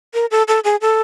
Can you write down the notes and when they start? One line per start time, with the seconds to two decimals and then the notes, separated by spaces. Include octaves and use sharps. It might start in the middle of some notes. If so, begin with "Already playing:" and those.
0.14 A#4
0.31 A4
0.48 A4
0.64 G#4
0.81 A4